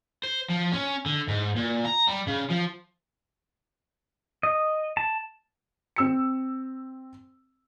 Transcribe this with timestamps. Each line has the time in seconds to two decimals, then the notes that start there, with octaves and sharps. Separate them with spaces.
0.23 C5
0.50 F3
0.73 C#4
1.06 D3
1.28 G#2
1.56 A#2
1.85 A#5
2.07 G3
2.27 C#3
2.50 F3
4.43 D#5
4.97 A5
5.96 C4 E6 C#7